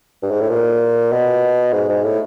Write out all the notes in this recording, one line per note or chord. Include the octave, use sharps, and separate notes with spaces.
G2
G#2
A2
A#2
B2
G#2
G#2
A2